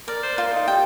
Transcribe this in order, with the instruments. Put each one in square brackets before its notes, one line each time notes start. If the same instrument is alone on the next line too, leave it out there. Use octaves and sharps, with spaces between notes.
[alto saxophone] A#4 [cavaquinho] D5
[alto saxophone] C5
[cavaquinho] F4 [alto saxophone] A#4
[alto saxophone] D#4
[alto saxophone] G4 [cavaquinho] G5